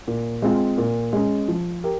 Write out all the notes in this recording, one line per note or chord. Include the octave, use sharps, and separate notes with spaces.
A#2
G#3 C4 F4
A#2
G#3 C#4
F3
G4 A#4